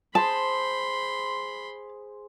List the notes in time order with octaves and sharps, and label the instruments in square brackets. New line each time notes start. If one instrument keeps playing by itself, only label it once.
[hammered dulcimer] G#4 C5 [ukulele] A5 [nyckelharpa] B5 C6